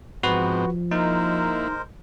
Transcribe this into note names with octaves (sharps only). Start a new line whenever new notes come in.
G#2 F3 B3 C4 F#4 B4
G#3 A#3 D#4 E4 A#4 C5